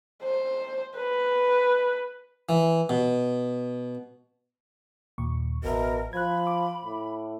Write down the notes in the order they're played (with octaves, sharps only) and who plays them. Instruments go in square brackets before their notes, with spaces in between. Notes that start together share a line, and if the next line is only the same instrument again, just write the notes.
[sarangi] C5
B4
[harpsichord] E3
B2
[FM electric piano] D#2 A#2 C#6
[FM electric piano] A1 E5 [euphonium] B2 [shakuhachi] A#4
[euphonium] F3 [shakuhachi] B5 [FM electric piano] F#6 G#6
[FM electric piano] D6
[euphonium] A2